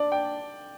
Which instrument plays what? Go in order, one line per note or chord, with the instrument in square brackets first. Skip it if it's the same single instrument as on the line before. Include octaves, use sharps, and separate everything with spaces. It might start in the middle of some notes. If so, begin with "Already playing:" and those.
Already playing: [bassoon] D4 [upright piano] D5
[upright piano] G5